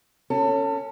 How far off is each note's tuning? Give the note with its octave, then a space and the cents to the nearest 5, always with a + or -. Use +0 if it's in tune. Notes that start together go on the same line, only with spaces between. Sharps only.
C#4 +0 A4 +30